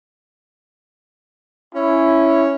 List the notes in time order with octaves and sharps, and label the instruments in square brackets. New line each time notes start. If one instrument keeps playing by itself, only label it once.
[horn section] C#4 [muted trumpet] E4